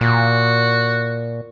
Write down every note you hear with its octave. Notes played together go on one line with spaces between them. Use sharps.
A#2 F#4